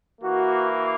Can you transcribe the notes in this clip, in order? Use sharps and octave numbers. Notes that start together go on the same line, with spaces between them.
E3 A#3 F#4